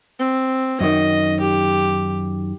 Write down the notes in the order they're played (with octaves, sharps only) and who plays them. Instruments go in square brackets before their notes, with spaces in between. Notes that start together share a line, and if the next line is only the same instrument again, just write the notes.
[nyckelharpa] C4
[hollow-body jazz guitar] F#2 D#3 [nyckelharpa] D#5
[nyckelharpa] G4